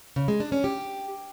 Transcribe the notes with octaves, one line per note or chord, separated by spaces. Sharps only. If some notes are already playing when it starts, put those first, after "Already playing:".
C#3
G#3
D4
C#4
G4